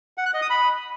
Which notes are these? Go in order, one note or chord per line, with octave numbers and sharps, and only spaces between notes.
F#5
F#6
D#5
D#6
B5